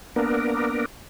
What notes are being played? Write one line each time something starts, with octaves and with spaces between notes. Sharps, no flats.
A#3 B3 D4 A#4